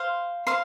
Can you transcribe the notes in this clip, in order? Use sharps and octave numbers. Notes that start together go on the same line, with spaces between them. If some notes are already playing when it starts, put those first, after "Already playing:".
Already playing: C5 F5 C6
C5 F5 C6